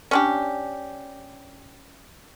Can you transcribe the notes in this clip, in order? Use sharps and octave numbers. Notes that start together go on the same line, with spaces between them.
C#4 D4 G4